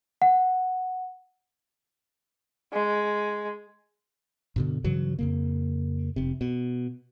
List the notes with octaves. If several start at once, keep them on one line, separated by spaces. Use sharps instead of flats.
F#5
G#3
G2 B2 D3
G2 C#3 E3 F#3
F2 C#3 A#3
F1 C3
B2